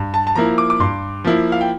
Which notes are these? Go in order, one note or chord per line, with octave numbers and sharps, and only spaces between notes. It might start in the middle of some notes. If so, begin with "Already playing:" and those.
Already playing: G2
A5
A5
F3 A#3 E4 A#5
D6
D6
G2 C6
F3 A#3 E4
F5
G5